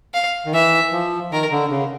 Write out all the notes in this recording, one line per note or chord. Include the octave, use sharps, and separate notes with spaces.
F5
D#3
E3 E5
F3
D#3 A#4
D3
C#3